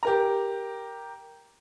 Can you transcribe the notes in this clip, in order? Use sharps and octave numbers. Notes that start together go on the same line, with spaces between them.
G4 A#4 A#5